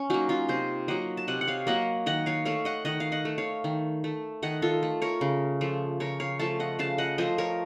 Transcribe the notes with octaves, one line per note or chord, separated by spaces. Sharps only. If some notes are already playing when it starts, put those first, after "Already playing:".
Already playing: C#4
F#3 A#3 D#4 F#4
C#4 F4
C3 C5 D#5
F#3 A#3 D#5 F#5
A5
C3 D#5 F#5
F#5
C#5 F5
F#3 A#3 D#5 F#5
D#3 D#5 F#5
C#5 F5
A3 C#5 F5
D#5 F#5
D#3 D#5 F#5
F5
D#5 F#5
A3
C#5 F5
D#3
A3
D#3 D#5 F#5
F4 A4
A3
A#4 C#5
C#3
F3 A3
C#3 A#4 C#5
C#5 F5
F3 A3 F5 A5
D#5 F#5
C#3 F5 A5
D#5 F#5
F3 A3 C5 D#5
A#4 C#5